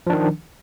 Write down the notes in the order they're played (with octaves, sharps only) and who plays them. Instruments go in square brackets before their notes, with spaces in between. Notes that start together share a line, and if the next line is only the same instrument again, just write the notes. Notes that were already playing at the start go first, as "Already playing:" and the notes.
[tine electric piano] F3
D4
D#3